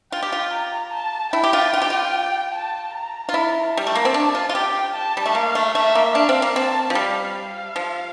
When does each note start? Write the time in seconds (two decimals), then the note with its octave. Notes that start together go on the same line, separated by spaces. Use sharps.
0.12 F4 G5
0.23 G4
0.32 F4
0.53 A#5
0.93 A5
1.33 E4 G5
1.43 G4
1.53 F4
1.74 F4
1.82 G4
1.90 F4
2.53 A5
2.94 A#5
3.29 F4
3.34 E4 A#5
3.73 G3 A5
3.87 A3
3.95 A#3
4.05 C4
4.14 D4
4.35 F4
4.49 F4
4.54 G4 G5
4.95 A5
5.17 G3
5.26 A3
5.35 A#3 F5
5.55 A3
5.75 A3 E5
5.95 A#3
6.15 D4 F5
6.29 C4
6.42 A#3
6.55 C4 A5
6.90 F3
6.95 G3 F5
7.36 F5
7.76 F3